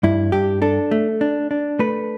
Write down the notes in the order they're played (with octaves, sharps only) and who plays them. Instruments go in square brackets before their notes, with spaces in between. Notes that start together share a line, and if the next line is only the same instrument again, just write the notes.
[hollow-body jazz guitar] G2 E4
G2 G4
D4 A4
A3
D4
D4
A3 B4